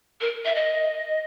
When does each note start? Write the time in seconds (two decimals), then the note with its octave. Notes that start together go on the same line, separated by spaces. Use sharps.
0.21 A#4
0.45 E5
0.55 D#5